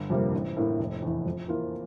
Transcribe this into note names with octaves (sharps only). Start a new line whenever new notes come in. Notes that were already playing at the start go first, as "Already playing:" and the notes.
Already playing: G1
F2 C3 G3 A#3
A1
A2 E3 A#3 E4
F1
E2 E3
F2
E3 A#3 F4